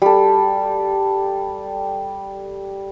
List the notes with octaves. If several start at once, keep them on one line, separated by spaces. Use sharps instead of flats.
G3 A4